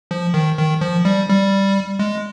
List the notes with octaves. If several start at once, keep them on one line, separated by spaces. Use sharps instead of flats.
F3
D#3
D#3
F3
G3
G3
G#3